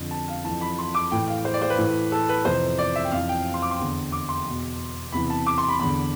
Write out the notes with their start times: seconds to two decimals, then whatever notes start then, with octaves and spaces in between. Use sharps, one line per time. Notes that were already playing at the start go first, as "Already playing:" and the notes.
Already playing: F2 D3
0.11 A5
0.28 F5
0.44 F2 E3 A5
0.61 B5
0.78 C6
0.95 D6
1.11 A2 E3 G5
1.28 F5
1.45 C5
1.54 D5
1.62 C5
1.70 B4
1.78 A2 E3
2.12 A4
2.29 B4
2.45 F2 C3 E3 C5
2.78 D5
2.95 E5
3.05 G5
3.12 F2 E3 F5
3.29 G5
3.54 C6
3.62 D6
3.71 C6
3.79 E2 D3
4.12 D6
4.29 C6
4.46 E2 B2
5.12 E2 C3 E3 B5
5.30 A5
5.46 D6
5.58 C6
5.68 B5
5.79 E2 D3 B5